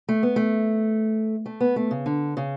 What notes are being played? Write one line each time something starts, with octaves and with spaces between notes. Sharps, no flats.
A3
B3
A3
A3
B3
A3
C#3
D3
C#3